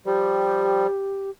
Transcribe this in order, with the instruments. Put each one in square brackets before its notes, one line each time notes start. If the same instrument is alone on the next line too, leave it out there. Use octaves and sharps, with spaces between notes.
[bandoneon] F3 G3 [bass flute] G4